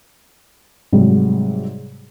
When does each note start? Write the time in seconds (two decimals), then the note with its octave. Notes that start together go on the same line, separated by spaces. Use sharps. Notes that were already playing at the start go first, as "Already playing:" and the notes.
0.93 G#2 C3 F#3 G3